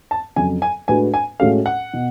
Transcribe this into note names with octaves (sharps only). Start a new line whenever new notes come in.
A5
F2 C#3 F#3 G#5
G#5
A2 G#3 D4 F#4 B4 G#5
G#5
A2 G#3 C#4 F#4 A4 F5
F#5
B2